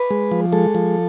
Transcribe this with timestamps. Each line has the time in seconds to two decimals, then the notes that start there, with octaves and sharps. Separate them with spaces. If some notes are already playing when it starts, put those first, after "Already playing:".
Already playing: B4
0.11 G#3
0.31 F3
0.53 G#3 A4
0.75 F3